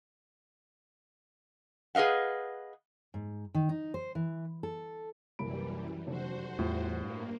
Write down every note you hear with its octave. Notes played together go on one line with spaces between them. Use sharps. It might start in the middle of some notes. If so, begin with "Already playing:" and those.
G#4 B4 D#5 F5 F#5
G#2
D#3
D#4
C5
E3
A4
C2 F#2 E3 G3 A#3 B5 D7
F1 F#2 F#4 C5
E2 A2 G3 F4
G2 A#3